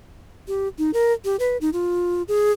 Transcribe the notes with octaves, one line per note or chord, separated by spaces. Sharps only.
G4
D#4
A#4
G4
B4
D#4
F4
G#4